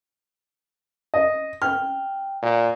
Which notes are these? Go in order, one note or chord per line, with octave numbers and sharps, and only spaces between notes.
D#5
G5 F6
A#2